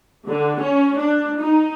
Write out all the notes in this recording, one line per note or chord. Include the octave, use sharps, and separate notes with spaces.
D3
C#4
D4
D#4